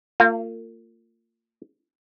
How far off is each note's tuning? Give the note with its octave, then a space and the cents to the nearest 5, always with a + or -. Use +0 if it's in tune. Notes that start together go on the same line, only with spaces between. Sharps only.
A#3 -40 F4 +0